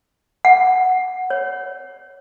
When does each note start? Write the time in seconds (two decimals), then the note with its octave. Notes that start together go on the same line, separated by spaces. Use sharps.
0.45 F#5
1.30 C#5